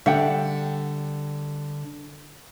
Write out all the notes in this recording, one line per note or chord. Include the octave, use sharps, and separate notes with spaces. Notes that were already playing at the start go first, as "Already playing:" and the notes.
D3 G3 E5 F#5 G5